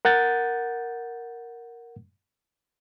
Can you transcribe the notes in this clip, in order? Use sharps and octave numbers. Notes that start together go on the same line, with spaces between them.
A#4 F#5 G6 A6